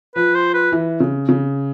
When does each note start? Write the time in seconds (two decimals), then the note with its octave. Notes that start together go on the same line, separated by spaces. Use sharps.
0.16 F3 B4
0.35 C5
0.54 B4
0.72 E3
1.00 C#3
1.29 C#3